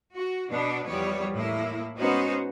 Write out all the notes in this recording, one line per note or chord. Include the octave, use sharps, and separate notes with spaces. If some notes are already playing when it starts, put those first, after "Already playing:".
F#4
B2 B3 D4
E2 F3 G3 B3 C#5
A2 A#3 E4
G#3 B3 C#4 D#4 F#4 C5